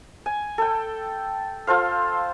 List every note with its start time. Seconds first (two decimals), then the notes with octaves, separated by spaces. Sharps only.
0.26 G#5
0.58 A4 G5
1.67 F4 A4 C5 F5